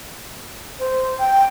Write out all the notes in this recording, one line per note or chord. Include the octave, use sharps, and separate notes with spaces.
C5
G5